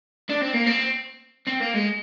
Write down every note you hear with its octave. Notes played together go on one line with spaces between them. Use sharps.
D4
C4
A#3
C4
C4
A#3
G#3